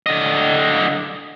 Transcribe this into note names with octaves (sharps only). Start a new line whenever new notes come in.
D3 D#5